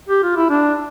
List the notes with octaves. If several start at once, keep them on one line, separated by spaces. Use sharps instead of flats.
G4
F4
E4
D4